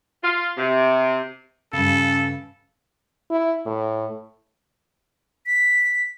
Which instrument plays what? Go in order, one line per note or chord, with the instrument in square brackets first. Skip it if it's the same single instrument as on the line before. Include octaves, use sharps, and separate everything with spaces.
[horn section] F4
C3
[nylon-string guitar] G2 C#3 [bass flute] C#4 [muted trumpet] A4
[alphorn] E4
A2
[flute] B6